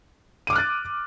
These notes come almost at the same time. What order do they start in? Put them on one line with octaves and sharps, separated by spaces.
D#7 D6 F6 F#6 A6